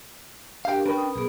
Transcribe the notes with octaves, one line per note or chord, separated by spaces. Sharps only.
D4 G4 A#4 F5 G5
C#4 D4 A#4 B4 G5
D#6
B1 B3 G#4